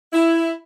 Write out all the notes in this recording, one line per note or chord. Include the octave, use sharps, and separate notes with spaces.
E4